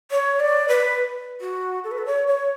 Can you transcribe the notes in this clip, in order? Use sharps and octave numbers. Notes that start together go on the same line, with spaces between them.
C#5
D5
B4
F#4
A4
B4
A4
C#5
C#5